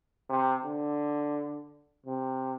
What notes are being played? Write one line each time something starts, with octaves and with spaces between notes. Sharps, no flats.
C3
D3
C3